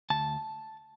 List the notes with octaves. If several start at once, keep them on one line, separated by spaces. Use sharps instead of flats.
D2 A5